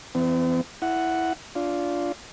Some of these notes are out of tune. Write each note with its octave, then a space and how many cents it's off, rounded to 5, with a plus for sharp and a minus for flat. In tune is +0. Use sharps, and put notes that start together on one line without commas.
E3 +20 C4 -45
E4 +0 F#5 +0
D4 -20 F4 +0